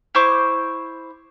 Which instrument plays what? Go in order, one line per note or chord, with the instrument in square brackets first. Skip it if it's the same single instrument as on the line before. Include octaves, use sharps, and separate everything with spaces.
[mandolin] E4 C5 C#6 D6